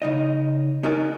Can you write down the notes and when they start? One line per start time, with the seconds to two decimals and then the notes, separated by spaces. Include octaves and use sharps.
0.02 C#3 D#4 D#5
0.83 C#4 D#4 F#4 A#4 D5 G#5